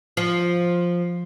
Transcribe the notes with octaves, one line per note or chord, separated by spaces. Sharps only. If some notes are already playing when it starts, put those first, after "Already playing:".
F3